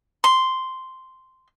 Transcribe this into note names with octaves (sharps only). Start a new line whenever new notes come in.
C6